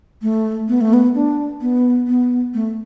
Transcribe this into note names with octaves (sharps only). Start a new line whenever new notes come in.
A3
B3
A3
B3
D4
B3
B3
A3